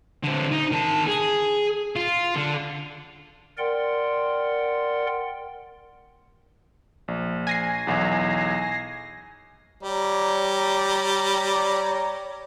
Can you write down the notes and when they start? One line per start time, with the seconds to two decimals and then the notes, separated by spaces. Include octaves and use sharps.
0.24 D3 C4
0.52 D#4
0.72 D#3 A5
1.08 G#4
1.96 F4
2.36 D3
3.58 A#4 D5 F#5 G5 C6
7.08 A#1
7.47 G#5 A#6 C7
7.87 B1 E2
9.83 G3 C#5 D5 A#5